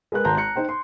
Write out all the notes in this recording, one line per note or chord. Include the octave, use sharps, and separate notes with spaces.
G#3 A#4 B4 F#6
G#1 A5 A#5 C6 G6
A5 A#5 F#6 C#7
D#4 C5 G5
C6